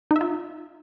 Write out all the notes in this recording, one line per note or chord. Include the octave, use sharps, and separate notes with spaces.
D#4
E5
F4